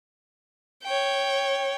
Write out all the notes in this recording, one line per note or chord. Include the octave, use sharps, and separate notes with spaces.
C#5 G5